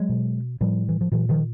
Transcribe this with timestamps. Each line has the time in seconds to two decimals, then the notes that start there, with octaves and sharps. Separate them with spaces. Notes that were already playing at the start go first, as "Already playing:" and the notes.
Already playing: F#3 G#3
0.09 B2
0.61 A2 F3 G3
0.89 E3
1.01 F3
1.12 A#2 E3 F#3
1.29 D#3 F3